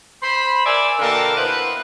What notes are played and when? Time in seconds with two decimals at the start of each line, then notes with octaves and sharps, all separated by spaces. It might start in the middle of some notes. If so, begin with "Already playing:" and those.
0.23 C5 B5
0.66 A#4 D5 E5 G#5
0.99 B2 D3 A#3 A#4 G5 A5
1.37 B3 E4 B4 C5